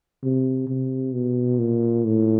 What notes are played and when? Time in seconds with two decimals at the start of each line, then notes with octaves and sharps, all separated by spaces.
0.23 C3
0.68 C3
1.13 B2
1.58 A#2
2.05 A2